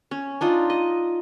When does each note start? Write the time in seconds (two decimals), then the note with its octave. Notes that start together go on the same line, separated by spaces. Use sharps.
0.11 C#4
0.41 D4 D#4 F4
0.70 D#5